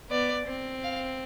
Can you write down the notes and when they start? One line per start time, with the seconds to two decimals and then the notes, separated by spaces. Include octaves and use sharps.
0.10 B3 D5
0.46 C4
0.83 F5